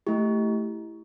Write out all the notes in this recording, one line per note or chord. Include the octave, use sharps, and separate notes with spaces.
A3 E4 G4